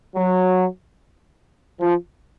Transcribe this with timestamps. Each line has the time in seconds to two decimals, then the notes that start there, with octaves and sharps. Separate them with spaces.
0.16 F#3
1.80 F3